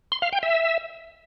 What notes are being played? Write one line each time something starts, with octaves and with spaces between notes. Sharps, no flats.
C6
F5
G5
E5